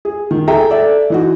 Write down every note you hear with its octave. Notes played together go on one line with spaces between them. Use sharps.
G#4
D#3
G#4 A4 E5 G5 A#5
A4 D5 E5
E3 D#4 F#4